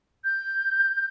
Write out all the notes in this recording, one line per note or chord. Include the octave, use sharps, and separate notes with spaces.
G6